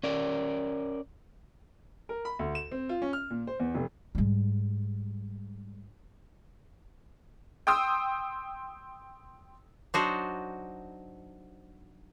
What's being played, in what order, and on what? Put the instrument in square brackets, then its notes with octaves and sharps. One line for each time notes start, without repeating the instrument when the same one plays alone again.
[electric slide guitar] C#4 A#4 D5
[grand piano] A#4
B5
D2
E7
C4
F4
C#4
F6
A#2
C5
E2
F1
[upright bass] G#2 G3
[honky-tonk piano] G5 C6 D#6 E6
[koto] F#3 D4 D#4 F#4 C5